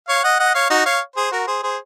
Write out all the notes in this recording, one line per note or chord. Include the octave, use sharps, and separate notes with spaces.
C#5 F5
D#5 F#5
D#5 F#5
C#5 F5
D#4 F#4
C#5 F5
G#4 C5
F#4 A#4
G#4 C5
G#4 C5